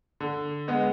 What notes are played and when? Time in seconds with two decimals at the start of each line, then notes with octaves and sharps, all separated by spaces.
0.20 D3
0.68 G#3 B3